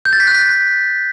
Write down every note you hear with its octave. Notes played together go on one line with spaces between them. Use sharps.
G6
A6
B6
F#6
B6